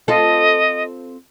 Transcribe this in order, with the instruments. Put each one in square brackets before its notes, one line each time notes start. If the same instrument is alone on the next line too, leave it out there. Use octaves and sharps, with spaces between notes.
[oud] C4 F4 A4 [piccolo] D#5